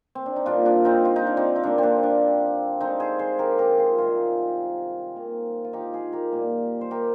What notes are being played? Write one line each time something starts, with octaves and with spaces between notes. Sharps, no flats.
C4
D4
D#4
A#2 G3 A#3 D4 F4
D4
C4 D#4
F4
D#4
D4
C4 D#4
D#4
D3 G3 A#3 D4
C4 D4
D4
D3 G#3 C4 D#4
G#4 C5
G#4 C5
G4 A#4
G4 A#4
F4 G#4
C3 D#3 G3 F4 G#4
D#3 A#3
F4
D#4 G4
F4 G#4
G4 A#4
A#2 G3 A#3
C5
G4 A#4